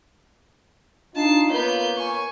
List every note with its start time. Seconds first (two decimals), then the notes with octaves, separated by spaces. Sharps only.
1.15 D4 D#4 F4 A5 C7
1.50 A#3 B3 C#5 G6
1.96 G#5 C#6